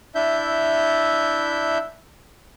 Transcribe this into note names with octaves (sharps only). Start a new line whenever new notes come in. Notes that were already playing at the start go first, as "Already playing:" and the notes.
D4 E4 E5 G6